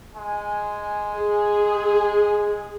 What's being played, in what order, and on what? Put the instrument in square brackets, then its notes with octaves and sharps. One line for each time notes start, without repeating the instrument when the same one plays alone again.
[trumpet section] G#3 G#5
[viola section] G#4